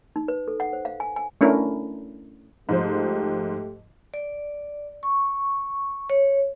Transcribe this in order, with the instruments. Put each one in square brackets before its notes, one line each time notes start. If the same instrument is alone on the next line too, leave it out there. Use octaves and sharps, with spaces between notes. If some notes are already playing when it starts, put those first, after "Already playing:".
[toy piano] D#4
B4
A4
F#5
C5
F5
G#5
G#5
[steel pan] A3 C#4 D4 E4 A#4
[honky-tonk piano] G#2 F3 C5 [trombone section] A3 G4
[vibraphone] D5
C#6
C#5